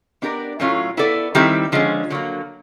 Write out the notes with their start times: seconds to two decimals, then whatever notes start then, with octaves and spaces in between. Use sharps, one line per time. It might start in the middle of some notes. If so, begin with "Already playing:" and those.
0.22 B3 D4 G4 A#4 D5
0.60 A2 F#3 A3 C#4 F4
0.97 B3 E4 A4 D5
1.35 D#3 G3 C4 E4 G4
1.72 D3 F3 G#3 C#4
2.10 D3 F#3 A#3